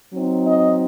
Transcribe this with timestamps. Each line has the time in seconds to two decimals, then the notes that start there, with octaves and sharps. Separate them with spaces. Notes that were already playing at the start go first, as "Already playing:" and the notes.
0.13 F#3 C4 D#4
0.45 D#5